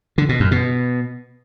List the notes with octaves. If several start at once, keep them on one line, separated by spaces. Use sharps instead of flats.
D3
B2
F#2
B2